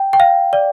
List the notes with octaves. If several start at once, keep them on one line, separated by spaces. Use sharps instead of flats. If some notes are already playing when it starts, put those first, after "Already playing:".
Already playing: G5
G5
F5
D5